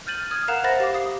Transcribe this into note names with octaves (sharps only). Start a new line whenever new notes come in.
F6 G6 A6 D#7 F#7
D#6 F6 G#6
A#4 F5 F#5 A#5 F#6 E7
C5 E5 F#5 B5 A6 A#6
G4 F5 D6
F5 D#6 C7